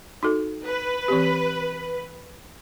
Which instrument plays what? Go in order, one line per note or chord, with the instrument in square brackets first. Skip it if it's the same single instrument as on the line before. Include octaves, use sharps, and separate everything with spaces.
[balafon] D#4 F#4 A4
[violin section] B4
[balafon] E3 C4 G4